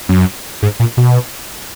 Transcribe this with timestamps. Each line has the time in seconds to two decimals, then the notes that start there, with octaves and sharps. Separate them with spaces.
0.09 F#2
0.63 G#2
0.80 A#2
0.97 B2